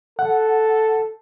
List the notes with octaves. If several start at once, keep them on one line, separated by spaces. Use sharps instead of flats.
A4 F#5